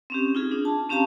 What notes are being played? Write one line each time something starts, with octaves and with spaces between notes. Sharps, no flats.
C4 C#4 G4
D#4 F4 G#4
D4
A5
C4 C#4 G4 F5 A5 A#5